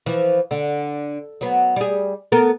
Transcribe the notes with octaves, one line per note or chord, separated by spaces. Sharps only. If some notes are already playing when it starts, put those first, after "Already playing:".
E3 F3
D3
F#3 B3
G3 G#4
B3 A4 A#4